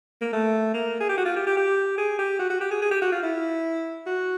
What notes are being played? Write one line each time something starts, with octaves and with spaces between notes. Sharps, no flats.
A#3
A3
A#3
G#4
G4
F#4
F4
G4
G4
G4
G#4
G4
F#4
F#4
G4
G#4
G#4
G4
F#4
F4
E4
F#4